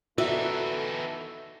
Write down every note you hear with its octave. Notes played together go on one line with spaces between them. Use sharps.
E3 B3 D#4 E4 F#4 A4 D5 E5